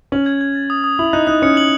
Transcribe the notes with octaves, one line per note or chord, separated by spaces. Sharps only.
C#4 F#7
G#6
G#6
A6
D#6
D#6
E4 F#7
D#4 F#6
D#4 F#6
C#4 C#7
F#7